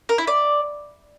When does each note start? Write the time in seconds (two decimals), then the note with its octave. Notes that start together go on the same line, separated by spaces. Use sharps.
0.09 A#4
0.18 E4
0.27 D5